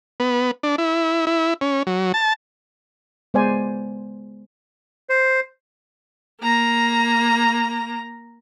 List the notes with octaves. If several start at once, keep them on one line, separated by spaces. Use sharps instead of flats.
B3
D4
E4
E4
C#4
F#3
A5
G#3 B3 C5 D5 G#5
C5
A#3 A#5